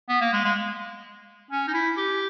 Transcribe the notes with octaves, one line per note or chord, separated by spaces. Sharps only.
B3
A#3
G#3
G#3
C#4
D#4
E4
G4